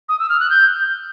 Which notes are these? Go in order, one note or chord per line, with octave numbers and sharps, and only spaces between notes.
D#6
E6
F6
F#6
G6